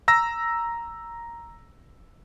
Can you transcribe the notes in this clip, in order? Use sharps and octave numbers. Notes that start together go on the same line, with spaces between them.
A#5 E6 A#6